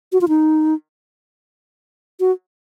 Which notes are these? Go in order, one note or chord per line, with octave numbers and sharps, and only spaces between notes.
F#4
F4
D#4
F#4